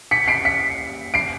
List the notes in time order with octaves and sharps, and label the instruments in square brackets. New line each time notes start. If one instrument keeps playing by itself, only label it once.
[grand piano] B6 C#7
C7 D7
B6 C#7
C7 D7